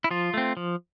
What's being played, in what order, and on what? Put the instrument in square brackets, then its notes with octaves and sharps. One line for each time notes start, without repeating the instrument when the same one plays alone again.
[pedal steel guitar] E4
F3 F4
A3 C4
F3